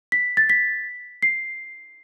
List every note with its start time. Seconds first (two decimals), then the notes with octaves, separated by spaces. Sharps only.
0.12 B6
0.37 A6
0.50 B6
1.23 C7